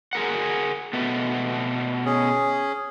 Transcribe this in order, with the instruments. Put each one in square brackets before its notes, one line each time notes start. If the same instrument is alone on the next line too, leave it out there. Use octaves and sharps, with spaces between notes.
[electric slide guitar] G#4 A#4 F#5
B2 A3 B3
[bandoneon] C#4 G#4